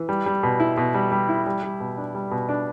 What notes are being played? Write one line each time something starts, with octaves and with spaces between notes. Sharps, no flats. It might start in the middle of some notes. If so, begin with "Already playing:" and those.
Already playing: E3
G3
G3
B2
E4
B2
G3
G3
E4
G3
G3
B2
D4
G3
B2
D4